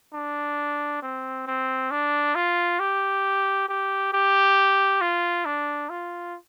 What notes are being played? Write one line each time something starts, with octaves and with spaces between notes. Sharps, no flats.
D4
C4
C4
D4
F4
G4
G4
G4
F4
D4
F4